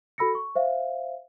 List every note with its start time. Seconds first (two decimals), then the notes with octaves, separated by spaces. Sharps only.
0.18 F#4 A4 B5 E6 A#6 C#7
0.35 C#6
0.56 C5 E5 F5